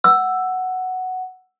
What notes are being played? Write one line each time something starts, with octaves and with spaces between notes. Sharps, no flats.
F#5 E6